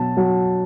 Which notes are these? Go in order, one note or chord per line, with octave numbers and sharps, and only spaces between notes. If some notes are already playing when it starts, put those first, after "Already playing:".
Already playing: B2 F#3 A5
F#3